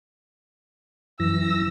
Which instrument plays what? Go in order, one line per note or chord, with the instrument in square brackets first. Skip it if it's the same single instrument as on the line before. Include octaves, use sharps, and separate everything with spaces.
[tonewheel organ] F#2 E3 A#6 [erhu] E6